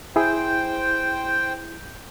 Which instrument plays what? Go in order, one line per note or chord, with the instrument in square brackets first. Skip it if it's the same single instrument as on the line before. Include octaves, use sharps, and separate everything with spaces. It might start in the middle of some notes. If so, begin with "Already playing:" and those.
[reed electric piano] E4 G#4 [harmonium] C5 G5